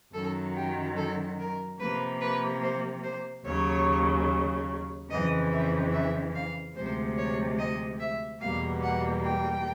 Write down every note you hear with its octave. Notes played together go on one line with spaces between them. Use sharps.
F#2 D#3 F#3 A4
G4
A4
A#4
C3 F3 A#3 B4
B4
C5
C5
D#2 C#3 F#3 C#5
F2 C#3 E3 D#5
E5
E5
F5
D2 C3 F3 G#3 C5
C#5
D#5
E5
E2 B2 G3 A#3 F5
F#5
G5